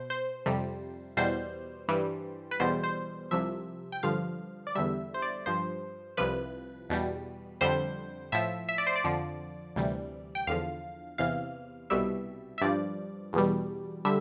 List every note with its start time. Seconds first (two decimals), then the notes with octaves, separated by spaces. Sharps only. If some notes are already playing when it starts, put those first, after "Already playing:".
Already playing: B2 C5
0.10 C5
0.46 F2 C3 G3
1.17 E2 B2 G3 C5
1.89 G2 E3 G3
2.51 B4
2.60 E2 B2 G3 C5
2.84 C5
3.31 C2 C3 F3 E5
3.92 G5
4.03 G2 D3 F3 F5
4.67 D5
4.75 E2 D3 G3 E5
5.14 C5
5.22 D5
5.46 G2 F3 C5
6.17 C2 C3 F3 B4
6.90 E2 B2 G3
7.61 F2 D3 G3 C5
8.32 A2 F3 E5
8.69 E5
8.78 D5
8.87 C5
8.96 D5
9.04 F2 D3 F3
9.76 D2 C3 E3 G3
10.35 G5
10.47 E2 D3 F3 F5
11.18 E2 C3 E3 F5
11.90 C2 B2 G3 E5
12.58 E5
12.61 G2 F3 D5
13.33 E2 B2 G3
14.05 D3 G3 E5